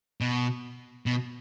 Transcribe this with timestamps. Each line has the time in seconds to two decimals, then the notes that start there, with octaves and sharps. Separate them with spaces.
0.21 B2
1.06 B2